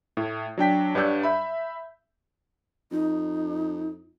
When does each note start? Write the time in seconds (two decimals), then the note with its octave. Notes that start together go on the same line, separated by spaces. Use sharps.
0.17 A2
0.58 F#3 D4 G5 B6
0.95 G2 C#5 D5 F#5 E6 G6
1.23 E5 B5
2.91 F2 D#4